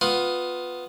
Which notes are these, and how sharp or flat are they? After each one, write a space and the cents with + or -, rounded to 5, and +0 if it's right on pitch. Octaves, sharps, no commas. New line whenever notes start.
B3 +10 F4 +20